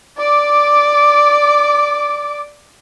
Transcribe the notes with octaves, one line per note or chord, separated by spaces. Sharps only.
D5 D6